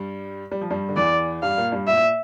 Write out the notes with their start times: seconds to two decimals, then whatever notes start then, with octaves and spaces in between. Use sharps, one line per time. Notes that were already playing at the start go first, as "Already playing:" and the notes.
Already playing: G2 G3
0.51 G3
0.61 F3
0.71 G2 G3
0.89 D3
0.96 E2 E3 D5
1.43 G2 G3 F5
1.57 A#2 A#3
1.72 G2 G3
1.88 A#2 E5